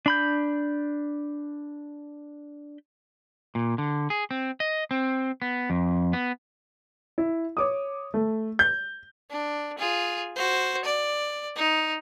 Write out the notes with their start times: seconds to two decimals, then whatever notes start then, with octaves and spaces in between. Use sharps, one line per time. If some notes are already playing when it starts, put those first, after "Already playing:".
0.06 D4 B5 G6
3.55 A#2
3.78 D3
4.10 G#4
4.31 C4
4.60 D#5
4.91 C4
5.42 B3
5.70 F2
6.13 B3
7.18 E4
7.57 C#5 D6 D#6
8.14 A3
8.59 G6
9.31 D4
9.78 F4 G#4
10.36 F#4 C5
10.85 D5
11.56 D#4